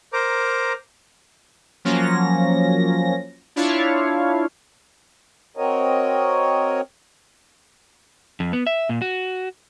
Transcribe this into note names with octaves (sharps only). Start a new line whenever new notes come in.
A#4 C5 A#5 D6
F3 F#3 A#3 C#4 A#6
D4 E4 F4 C#5 F5
C4 F#4 A#4 C#5 D#5
F2
B3
E5
A#2
F#4